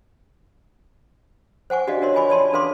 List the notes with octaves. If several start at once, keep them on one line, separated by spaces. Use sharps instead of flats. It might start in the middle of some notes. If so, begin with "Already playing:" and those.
C5 F#5 G#5 C#6
D4 F#4 G4 D5 D#5 F5
D4 A#4 C#5 C6
F4 C#5 D#5 G#5 B5 C#6
C#5 D5 A5 C6
D4 A4 B4 F5 C6 D6